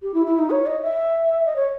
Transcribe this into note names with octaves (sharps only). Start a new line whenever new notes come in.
G4
E4
E4
D#4
C#5
D#5
E5
D#5
C#5